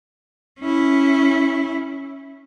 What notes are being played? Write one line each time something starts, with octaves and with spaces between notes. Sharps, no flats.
C#4 E4